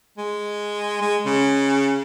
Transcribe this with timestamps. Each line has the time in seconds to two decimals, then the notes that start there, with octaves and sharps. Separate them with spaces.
0.18 G#3
1.01 G#3
1.25 C#3